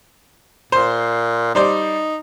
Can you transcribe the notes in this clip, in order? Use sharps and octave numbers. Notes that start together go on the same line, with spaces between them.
A#2 C5
G3 D#4 C5 D5